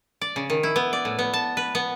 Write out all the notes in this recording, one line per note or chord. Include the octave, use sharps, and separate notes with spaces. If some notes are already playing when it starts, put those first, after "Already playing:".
D5
C#3
D#3
E4
B3
D5
A2
B3
A5
B4
B3